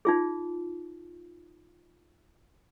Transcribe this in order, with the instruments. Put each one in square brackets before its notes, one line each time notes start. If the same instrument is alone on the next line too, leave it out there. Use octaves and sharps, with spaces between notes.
[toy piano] D#4 F4 G#4